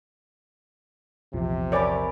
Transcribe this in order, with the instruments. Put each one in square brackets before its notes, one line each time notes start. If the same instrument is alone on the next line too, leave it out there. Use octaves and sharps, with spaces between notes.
[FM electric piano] A#1 E2 F3 [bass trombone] C3
[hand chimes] A#4 G#5 B5 [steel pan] C#5 D5